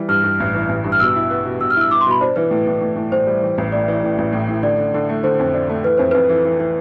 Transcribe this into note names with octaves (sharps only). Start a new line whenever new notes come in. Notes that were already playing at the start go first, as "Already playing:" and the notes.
Already playing: E3 G3
G2 F6
G2
A1
E3
A1
G2
F6
B2 E6
E4
B3
B2
B2 E6
F6
E4 E6
E4 D6
C6
B2 B5
D4 C5
E3 B4
A2
A2
A2
A2
A2 C5
G3
E3
A1
A2 D5
E3
A2
A1
A2
A2
D3 D5
D3
D3
A3
D3 C5
F2
D4
A3
E3 B4
F2 C5
F2 B4
E3
E3
E3